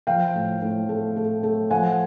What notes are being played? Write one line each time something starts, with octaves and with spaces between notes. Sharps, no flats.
F3 F5 G5
A2
A2
A3
A3
A3
F3 F#5 G#5